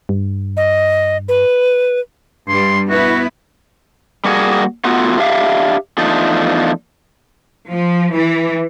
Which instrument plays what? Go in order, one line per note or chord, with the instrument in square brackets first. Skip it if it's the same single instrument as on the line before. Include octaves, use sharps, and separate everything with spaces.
[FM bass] G2
[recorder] D#5
B4
[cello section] G2 G3 [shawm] C6
[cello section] B3 E4 B4 [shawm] F#4
[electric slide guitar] G3 A#3 F#4 G#4
A3 B3 F4 F#4
D4 G4 E5 F5
E2 F3 A3 D4 D#4 F4
[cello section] F3
E3